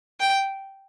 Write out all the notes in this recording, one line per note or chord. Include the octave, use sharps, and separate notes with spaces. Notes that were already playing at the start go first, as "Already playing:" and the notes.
G5